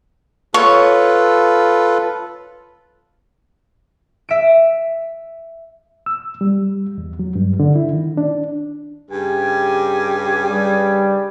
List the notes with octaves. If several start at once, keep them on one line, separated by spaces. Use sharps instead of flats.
F4 A4 B4 C#5
E5 D7
E6
G3
E2
F#3
G2
D3
E4
D#3
D4
G2 C#3 G4 G#5
G3